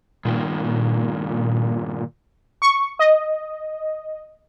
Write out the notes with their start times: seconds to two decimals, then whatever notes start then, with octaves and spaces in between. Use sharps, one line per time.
0.25 G2 A#2 D#3
2.62 C#6
2.99 D#5